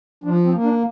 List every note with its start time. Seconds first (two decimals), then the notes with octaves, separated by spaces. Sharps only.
0.24 F3 D4
0.44 C4
0.54 A#3
0.63 D4